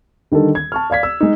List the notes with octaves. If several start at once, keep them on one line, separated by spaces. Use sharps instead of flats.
D3 D#3 G3 A4
G#6
A5 C#6 F6
D5 F5 G#6 B6
E6
G#3 D#4